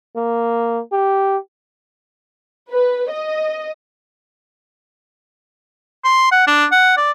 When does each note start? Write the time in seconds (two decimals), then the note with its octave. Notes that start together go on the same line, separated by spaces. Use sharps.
0.16 A#3
0.92 G4
2.71 B4
3.10 D#5
6.04 C6
6.32 F#5
6.47 D4
6.72 F#5
6.97 D5